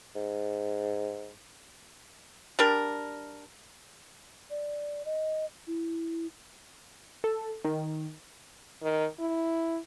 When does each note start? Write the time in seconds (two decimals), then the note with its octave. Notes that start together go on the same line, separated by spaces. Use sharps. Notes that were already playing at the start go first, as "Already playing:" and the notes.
0.15 G#2
2.59 G3 D4 A#4
4.50 D5
5.05 D#5
5.67 E4
7.24 A4
7.65 D#3
8.83 D#3
9.19 E4